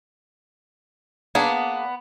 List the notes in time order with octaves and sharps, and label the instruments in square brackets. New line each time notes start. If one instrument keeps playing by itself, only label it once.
[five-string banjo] A#3 D4 G#4 [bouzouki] B3